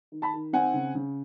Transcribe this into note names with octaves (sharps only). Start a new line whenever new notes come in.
D#3
A5 B5
D#3
C4 F#5 G#5
C#3
C#3